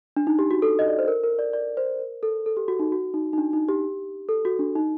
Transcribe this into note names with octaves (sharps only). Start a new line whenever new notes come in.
D4
D#4
G4
F#4
A4
D#5
D5
C5
A#4
A#4
D5
D5
C5
A#4
A4
A4
G4
F#4
D#4
F#4
D#4
D#4
D4
D#4
G4
A4
F#4
D4
D#4